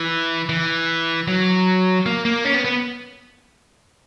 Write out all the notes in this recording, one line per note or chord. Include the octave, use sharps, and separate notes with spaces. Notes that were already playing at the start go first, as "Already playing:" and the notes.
Already playing: E3
E3
F#3
A#3
A#3
C#4
B3
B3